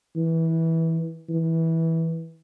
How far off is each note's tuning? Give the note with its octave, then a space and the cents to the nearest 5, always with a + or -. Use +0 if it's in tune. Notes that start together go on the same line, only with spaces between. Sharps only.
E3 -15
E3 -15